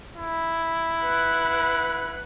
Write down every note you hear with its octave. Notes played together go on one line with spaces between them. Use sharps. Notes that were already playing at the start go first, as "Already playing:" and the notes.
E4
B4 F#5